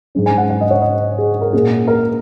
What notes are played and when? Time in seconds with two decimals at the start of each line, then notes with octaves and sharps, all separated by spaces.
0.15 G#2 G#3 C#4
0.26 G#5
0.38 F#5
0.50 F#5
0.61 D#5
0.71 C#5
0.82 D#5
1.18 G#4
1.41 A#4
1.53 A#2 A#3 C#4 G#4
1.88 A#4